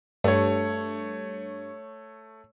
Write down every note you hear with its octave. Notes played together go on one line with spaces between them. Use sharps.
G2 A3 C#5